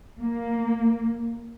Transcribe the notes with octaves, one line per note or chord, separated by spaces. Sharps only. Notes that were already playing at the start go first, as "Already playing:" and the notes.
A#3